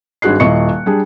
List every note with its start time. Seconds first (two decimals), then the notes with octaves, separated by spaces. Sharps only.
0.22 G#1 G2 F#4 G#4 F#6 C7
0.40 D#1 E4 D#5 C#6 C#7
0.86 G3 D4 G#4